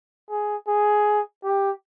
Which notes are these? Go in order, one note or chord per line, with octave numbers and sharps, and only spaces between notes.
G#4
G#4
G4